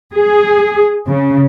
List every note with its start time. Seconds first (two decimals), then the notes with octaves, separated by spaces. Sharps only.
0.13 G#4
1.08 C#3